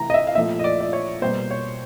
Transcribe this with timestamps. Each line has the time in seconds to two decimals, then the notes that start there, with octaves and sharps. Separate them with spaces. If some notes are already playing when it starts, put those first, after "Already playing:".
Already playing: C3 E3 A3 A#5
0.10 D#5
0.14 E5
0.27 F5
0.35 A#2 F3 A3 E5
0.59 D#5
0.64 D5
0.81 D5
0.93 C#5
1.22 B2 G3 A#3 C5
1.51 C#5